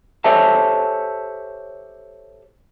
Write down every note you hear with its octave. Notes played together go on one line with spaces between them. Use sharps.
G4 A4 C5 C#5 E5 A5